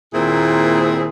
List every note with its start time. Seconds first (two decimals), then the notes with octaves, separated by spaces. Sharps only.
0.14 D#2 A#2 C4 E4 G#4